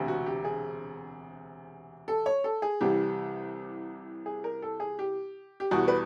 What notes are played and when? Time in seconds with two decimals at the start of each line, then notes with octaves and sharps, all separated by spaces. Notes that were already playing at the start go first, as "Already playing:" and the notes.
Already playing: E1 D2 C3
0.08 F#4
0.26 G4
0.45 G#4
2.08 A4
2.26 C#5
2.44 A4
2.62 G#4
2.81 C2 C3 E3 G3 G4
4.26 G#4
4.44 A#4
4.62 A4
4.80 G#4
4.99 G4
5.60 G4
5.71 E2 B2 G3 F#4
5.88 B4